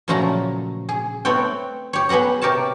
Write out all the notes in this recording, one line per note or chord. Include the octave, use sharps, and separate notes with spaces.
A#2 C#3 F3 F#3 A3 A#5
G#4
A3 B3 C4 C#5 G5
G4 C#5
B3 G#4 B4 F#5 A#5
C3 G4 A#4 C#5 A5